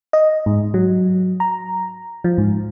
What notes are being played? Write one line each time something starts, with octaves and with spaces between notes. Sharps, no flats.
D#5
G#2
F#3
A#5
F3
G#2